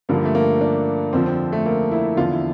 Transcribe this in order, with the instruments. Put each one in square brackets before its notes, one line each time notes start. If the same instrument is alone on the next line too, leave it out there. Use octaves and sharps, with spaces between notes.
[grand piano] G2 D3 F3 A#3
A3
A#3
D4
F2 D3 F3 C4
C4
A3
A#3
E4
E2 D3 F3 F4
E4